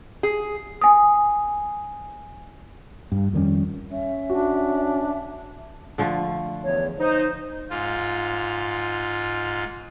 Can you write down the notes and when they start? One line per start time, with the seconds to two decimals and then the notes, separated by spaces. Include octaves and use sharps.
0.23 G#4
0.81 G#5 D#6
3.12 G2
3.33 F2 D#3 G3 C#4
3.91 C#4 E5
4.29 D4 F#4
5.98 D3 F3 A3
6.64 E2 C#5
6.99 D#4 C5
7.70 G#2 F4